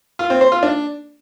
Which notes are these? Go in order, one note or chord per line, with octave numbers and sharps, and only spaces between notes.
F4
C4
C5
F4
D4